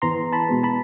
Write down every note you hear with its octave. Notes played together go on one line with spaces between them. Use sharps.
E2 A#5 C6
A5 B5
B2 G#3 B3
A5 B5